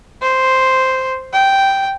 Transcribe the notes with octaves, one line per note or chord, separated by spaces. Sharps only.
C5
G5